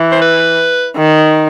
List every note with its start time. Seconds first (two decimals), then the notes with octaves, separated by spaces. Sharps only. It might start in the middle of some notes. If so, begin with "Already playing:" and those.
Already playing: E3
0.12 C5
0.22 B4
0.97 D#3